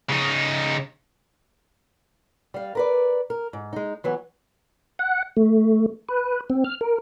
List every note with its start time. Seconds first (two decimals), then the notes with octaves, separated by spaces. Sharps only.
0.09 C#3 D#4
2.54 G3 F5
2.75 A#4 B4 D5
3.30 A#4
3.53 G#2
3.73 G#3 D#4
4.04 E3 F#3 B3
4.99 F#5
5.37 A3
6.09 B4
6.50 C4
6.64 F6
6.81 A#4